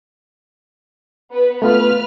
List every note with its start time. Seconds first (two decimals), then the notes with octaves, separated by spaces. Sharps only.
1.32 B3 B4
1.62 A3 B3 F4 B4 F6